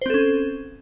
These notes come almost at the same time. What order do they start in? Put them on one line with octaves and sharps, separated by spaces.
C5 C4 A4 C#4